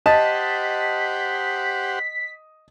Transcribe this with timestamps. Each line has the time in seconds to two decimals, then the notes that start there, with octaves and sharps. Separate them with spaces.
0.06 G4 C5 D#5 F#5 A5 B6